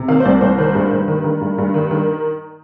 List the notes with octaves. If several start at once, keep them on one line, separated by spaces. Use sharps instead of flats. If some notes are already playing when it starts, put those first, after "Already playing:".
Already playing: C3
D#3 F5
C5
C2 D5
C2 C5
D#3 C5
G2
G2
D#3
D#3
G2
G2
D#3
D#3 A#4